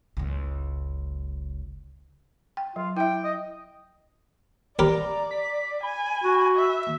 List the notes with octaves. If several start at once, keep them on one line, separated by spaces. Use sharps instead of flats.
F#1 C#2
G5
F#3 F4
E4 E5 G5
D#5
G4 A#4 B4 D5 A#5
B6
G#5 B5
F#4
E5